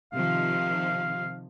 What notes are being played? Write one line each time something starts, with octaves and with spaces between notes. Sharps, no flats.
C3 D#3 F3 F5